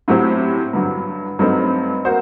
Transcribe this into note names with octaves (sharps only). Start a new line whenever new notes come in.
A2 F#3 C4 G4 C5
G2 D3 F#3
G2 F#3 A3 C4 D#4
A#3 F#4 C5